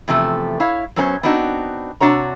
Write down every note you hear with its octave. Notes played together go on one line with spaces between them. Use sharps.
E2 C3 F3 A3
E4 C#5 F5
F#2 F#3 B3 C#4 G4 C5
B3 C4 D4 D#4 F#4
C3 D4 F#4 C#5 A#5